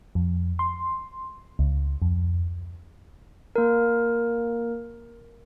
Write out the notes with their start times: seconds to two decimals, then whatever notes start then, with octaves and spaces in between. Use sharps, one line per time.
0.15 F2
0.59 C6
1.59 C#2
2.02 F2
3.56 A#3 A#4